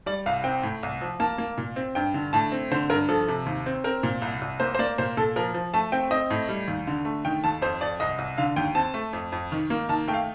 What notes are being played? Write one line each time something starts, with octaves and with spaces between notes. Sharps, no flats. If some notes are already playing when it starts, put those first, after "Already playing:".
G3 D5
C2 F5
C4 G5
A2
C2
F3
A#3 A5
A#3
A#2
C4
G2 G5
D3
A2 A5
C4
D3 C5
G2 A#4
F3 A4
C3
D#2
C4
C4 A#4
A#2
C2
C2
A#3 C5
C5
A#3 D5
A#2 C5
A#2 A4
F3 A#4
F3
A3 A5
C4 G5
C4 D#5
A2
G3
D#2
D3
A3
D#3 G5
D#2 A5
F2 C5
F2 D5
C2 D#5
C2
D3 F5
D#2 G5
C4 A5
A3
F2
F2
D#3
A#3
D#3 A5
A3 G5
F5